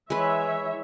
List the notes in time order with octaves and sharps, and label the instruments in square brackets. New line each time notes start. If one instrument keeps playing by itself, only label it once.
[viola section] E3 C#5 E5 [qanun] G#3 B4